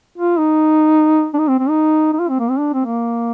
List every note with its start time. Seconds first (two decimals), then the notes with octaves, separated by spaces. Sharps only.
0.18 F4
0.38 D#4
1.34 D4
1.38 D#4
1.48 C4
1.59 C4
1.69 D#4
2.13 D#4
2.19 F4
2.29 C4
2.39 A#3
2.49 C4
2.59 D4
2.73 C4
2.86 A#3